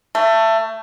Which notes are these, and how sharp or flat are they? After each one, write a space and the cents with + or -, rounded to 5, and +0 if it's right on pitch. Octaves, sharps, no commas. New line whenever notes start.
A3 +20